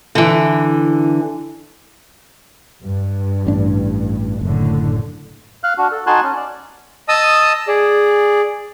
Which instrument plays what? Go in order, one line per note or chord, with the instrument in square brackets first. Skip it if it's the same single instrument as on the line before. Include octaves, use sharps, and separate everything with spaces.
[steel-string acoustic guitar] D3 E3
[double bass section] G2
[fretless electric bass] A1 D4
[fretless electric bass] F#1 [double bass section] A2 D3
[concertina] F5 F6 F#6
D4 F#4
A4
D#4 F#4 G#5 A5 C6 F#6
C#4
D5
[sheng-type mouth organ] D#5 A5 D#6 E6
G#4 D5